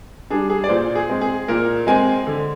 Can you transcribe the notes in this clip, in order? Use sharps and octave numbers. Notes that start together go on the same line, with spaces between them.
G3 D4 G#4
G#4
D5
A#2 C5
G#4
G#3 C4
G#4
A#2 A#4
G#3 C4 G#5
D3